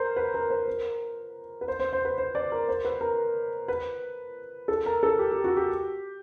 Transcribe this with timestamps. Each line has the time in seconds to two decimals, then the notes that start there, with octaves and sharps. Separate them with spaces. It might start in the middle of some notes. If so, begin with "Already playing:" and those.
Already playing: A#4 C5
0.16 B4
0.34 A#4
0.50 C5
0.68 A#4
1.61 B4
1.68 C5
1.80 C5
1.93 C5
2.05 B4
2.18 C5
2.35 D5
2.52 A#4
2.69 C5
2.85 B4
3.01 A#4
3.68 B4
4.68 A4
4.86 A#4
5.03 A4
5.19 G4
5.32 G4
5.44 F#4
5.57 G4